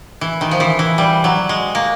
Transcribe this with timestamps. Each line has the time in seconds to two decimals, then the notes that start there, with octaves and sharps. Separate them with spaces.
0.21 E3
0.41 D#3
0.51 F3
0.60 E3
0.79 E3
0.98 G3
1.24 F#3
1.49 G#3
1.75 A#3